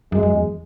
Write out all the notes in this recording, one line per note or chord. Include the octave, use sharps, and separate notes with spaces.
F#2 G#3
F#2
E2